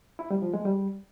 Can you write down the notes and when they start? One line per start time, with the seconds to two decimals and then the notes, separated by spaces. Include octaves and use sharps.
0.19 E4
0.31 G3
0.42 F3
0.54 G#3
0.65 G3